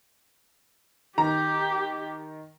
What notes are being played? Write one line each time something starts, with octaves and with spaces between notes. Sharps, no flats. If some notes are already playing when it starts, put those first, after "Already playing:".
D#3 G4 A#5